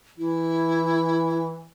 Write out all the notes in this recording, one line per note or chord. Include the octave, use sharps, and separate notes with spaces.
E3 E4